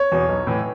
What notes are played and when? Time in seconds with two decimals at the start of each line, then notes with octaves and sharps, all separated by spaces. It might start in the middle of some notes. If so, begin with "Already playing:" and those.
Already playing: C#5
0.12 E2 B2
0.29 B1
0.47 A2 E3